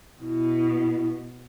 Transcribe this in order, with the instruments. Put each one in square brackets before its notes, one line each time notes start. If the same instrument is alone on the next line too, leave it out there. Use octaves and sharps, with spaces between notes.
[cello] B2 [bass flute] E4